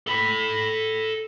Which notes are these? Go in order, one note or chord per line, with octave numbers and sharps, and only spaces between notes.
A4 B5